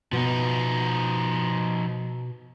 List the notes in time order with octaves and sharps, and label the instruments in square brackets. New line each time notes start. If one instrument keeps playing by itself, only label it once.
[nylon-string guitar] B2 [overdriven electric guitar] F3 D#4